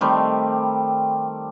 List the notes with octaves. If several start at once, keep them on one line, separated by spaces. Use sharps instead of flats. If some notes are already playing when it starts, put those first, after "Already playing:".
D#3 G3 A3 C4